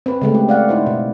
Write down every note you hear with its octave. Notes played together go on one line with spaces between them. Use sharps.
C4 B4
C#3 G#3 A3
G4
D5 F5 F#5
D#4 E4 C5
B2